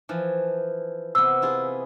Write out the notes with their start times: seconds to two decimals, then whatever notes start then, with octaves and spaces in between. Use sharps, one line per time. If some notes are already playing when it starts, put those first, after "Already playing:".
0.09 E3 F3
1.15 C3 B3 E6
1.42 E4 F4 G#4